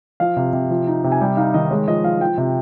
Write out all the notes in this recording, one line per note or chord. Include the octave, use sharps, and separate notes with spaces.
F3 F5
C3
C3
F3
D#4
C3
G#5
G3 G5
D#4 F5
D#3 D#5
G#3 C#5
F3 D#5
F3 F5
F3 G5
C3